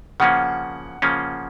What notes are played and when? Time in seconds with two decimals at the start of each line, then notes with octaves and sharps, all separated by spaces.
0.20 C#3 F3 A#3 C#4 F#5
1.02 C#3 F3 A#3 C#4